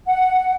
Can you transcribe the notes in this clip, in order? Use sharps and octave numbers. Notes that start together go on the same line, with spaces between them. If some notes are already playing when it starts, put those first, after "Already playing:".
F#5